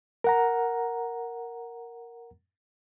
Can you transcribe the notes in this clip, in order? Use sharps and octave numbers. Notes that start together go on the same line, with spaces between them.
A#4 F#5 A#5